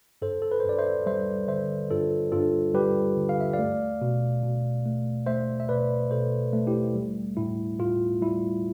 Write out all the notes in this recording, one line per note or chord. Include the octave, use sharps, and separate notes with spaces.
G2 A4 C5
A4
B4
C5
G2 D5
C5 E5
G3 C5 E5
D3 C5 E5
G2 F4 A4
G2 F4 A4
G3 G4 B4
D3
F5
E5
D5 F5
A3
B2
B2
A3
A3 C5 E5
E5
B2 B4 D5
B2 A4 C5
A3
E4 G4
G3
A2 E4
A2 F4
G3 E4